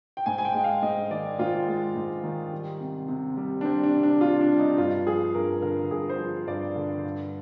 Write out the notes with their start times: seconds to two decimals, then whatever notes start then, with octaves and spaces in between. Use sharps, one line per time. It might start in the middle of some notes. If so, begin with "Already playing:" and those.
0.17 G5
0.26 G#2 G#5
0.38 G#5
0.45 G5
0.54 G#3
0.64 F5
0.83 G#2 D#5
1.11 D#3 D5
1.39 G#2 F4
1.68 G#3
1.96 G#2
2.24 D#3
2.52 G3
2.80 C3
3.09 C3
3.37 G3
3.61 D4
3.65 G3 C4
3.83 D4
3.93 C3
4.03 D4
4.21 C3 F4
4.41 D4
4.50 G3
4.59 D#4
4.78 G2 F4
5.06 F3 G#4
5.34 G2 A#4
5.62 D3 A#4
5.91 G2 G#4
6.09 C5
6.19 F3
6.47 G2 D5
6.76 D3
7.04 G2